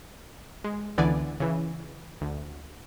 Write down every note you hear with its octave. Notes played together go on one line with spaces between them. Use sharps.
G#3
C#2 D3 E3 B3 D5 G#5
C#3 E3
D2